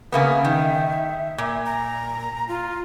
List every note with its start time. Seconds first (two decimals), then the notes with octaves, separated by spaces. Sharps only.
0.12 C#3 A#3 B3 E5
0.45 D#3
1.38 A#2
1.66 A#5
2.48 F4